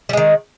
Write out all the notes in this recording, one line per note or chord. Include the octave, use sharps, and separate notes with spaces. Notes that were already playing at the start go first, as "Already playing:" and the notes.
D#3 G3 G#3